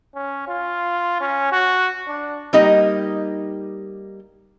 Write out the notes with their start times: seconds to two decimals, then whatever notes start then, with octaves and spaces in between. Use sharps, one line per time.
0.15 C#4
0.48 F4
1.20 C#4
1.52 F#4
2.08 D4
2.53 G3 A#3 D#4 G4 D#5